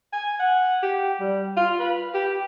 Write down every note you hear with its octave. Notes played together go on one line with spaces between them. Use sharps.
G#5
F#5
G4
G3
F4
B4
G4